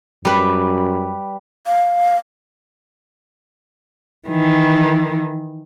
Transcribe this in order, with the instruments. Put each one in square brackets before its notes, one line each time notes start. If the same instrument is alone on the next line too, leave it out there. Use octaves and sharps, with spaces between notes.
[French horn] F#2 [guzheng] G3 B4
[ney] F5
[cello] D#3 E3